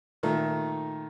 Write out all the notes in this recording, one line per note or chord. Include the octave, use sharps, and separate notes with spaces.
A#2 D#3 A3